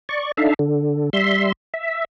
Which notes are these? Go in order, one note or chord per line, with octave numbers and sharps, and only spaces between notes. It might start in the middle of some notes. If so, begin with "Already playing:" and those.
D5 C#6
D4 D#4 A4 E5 F5
D3
G3 E5 C6
E5